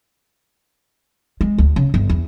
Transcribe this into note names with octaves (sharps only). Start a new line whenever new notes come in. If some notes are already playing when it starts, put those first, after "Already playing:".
G#3
D2
C#3
G1
E2